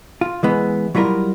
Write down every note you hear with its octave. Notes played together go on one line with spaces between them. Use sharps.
F4
E3 G#3 B3
F#3 G3 E4 F4 A#4